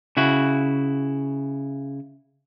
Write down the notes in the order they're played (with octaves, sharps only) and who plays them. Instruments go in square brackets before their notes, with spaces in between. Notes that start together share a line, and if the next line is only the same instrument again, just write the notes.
[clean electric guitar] C#3 E4 F#4